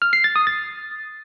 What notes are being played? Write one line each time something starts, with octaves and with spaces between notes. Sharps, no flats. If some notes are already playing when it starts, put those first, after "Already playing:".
F6
C7
A6
D#6
A6